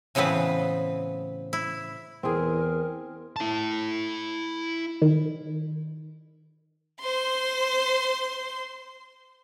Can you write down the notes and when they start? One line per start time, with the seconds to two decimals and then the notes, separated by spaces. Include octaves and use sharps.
0.15 A2 C#3 E3 B3 C4 B4
1.53 E4
2.23 E2 C4 G#4 A#4
3.36 E4 A5
5.02 D#3
7.01 C5 C6